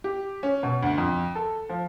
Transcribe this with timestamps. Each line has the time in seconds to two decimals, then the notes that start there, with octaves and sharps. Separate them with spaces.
0.04 G4
0.43 C#4
0.63 B2
0.83 D2
0.98 F2
1.35 A4
1.69 F3